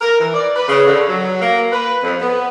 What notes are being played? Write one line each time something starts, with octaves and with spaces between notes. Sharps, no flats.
A#4
E3
D5
B4
C#3
D3
F#3
A#3
B4
F2
B3